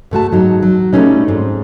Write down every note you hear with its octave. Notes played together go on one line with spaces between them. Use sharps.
G#2 A3 F#4 A5
G#2 F#3 D#4
F#3
G3 A3 A#3 C4 C#4 D#4
G#2 C4